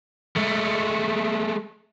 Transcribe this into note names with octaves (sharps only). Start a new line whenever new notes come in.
G#3 A3